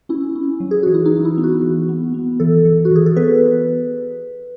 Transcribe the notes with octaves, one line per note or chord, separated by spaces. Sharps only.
C#4 E4
C#4
F#3
G#4
E3 F#4
E4
D#4
E3
E4
B3
F#4
E3
B3
B3
E3 A4
E3
F#4
E3 G#4
A4
B3 B4